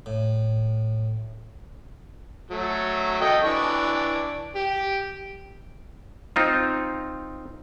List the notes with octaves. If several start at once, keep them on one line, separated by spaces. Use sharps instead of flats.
A2
F#3 A3
A4 D#5 G5
E3 D4 C#6
G4
C4 D#4 F4